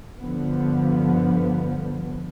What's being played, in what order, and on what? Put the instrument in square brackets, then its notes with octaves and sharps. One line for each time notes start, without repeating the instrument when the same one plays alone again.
[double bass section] G2 D3 F3 B3